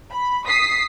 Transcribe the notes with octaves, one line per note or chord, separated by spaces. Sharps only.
B5
D#6 B6 C7